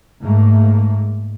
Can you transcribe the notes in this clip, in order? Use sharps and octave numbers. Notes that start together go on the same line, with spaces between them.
G#2 A3 A#3